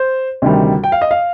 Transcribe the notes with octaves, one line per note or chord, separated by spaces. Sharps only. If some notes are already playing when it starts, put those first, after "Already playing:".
Already playing: C5
D2 C3 D#3 G3
G5
F5
D#5
F5